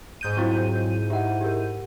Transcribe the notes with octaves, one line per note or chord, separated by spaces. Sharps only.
G#2 G6 D#7
F#3 C4 E4 F4 C#6
D#4 E4 G4 F#5
G4 A#4